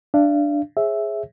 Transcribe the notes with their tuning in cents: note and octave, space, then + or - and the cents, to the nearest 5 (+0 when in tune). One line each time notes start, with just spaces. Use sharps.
D4 +0 F5 -40
G#4 +0 C#5 -35 E5 +0